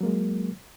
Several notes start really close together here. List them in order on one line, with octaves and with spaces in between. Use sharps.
F#3 A#3 G#3